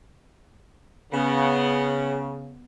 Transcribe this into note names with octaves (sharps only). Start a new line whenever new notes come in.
C#3 B3 F#5